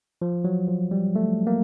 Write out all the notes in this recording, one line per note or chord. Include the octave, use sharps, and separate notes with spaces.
F3
F#3
F3
G3
A3
A#3